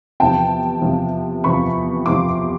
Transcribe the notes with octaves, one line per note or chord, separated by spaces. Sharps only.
E2 C3 F3 G5 A5
E2 C3 F3
E2 C3 F3 B5 C#6
E2 C3 F3 C6 D6